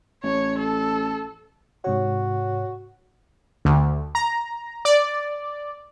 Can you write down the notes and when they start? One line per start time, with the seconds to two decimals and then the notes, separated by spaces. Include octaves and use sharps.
0.23 A1 C#5
0.59 A4
1.84 G#2 C3 F#4 C#5
3.65 D2
4.15 A#5
4.85 D5